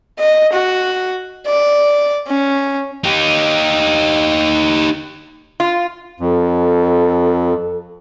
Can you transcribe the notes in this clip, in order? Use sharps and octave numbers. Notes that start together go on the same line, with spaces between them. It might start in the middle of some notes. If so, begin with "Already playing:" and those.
D#5
F#4
D5
C#4
D#4 G4
F4
F2 A4